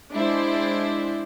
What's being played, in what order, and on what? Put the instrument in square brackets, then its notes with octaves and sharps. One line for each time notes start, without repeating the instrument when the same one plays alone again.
[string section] G#3 D4 E4 C5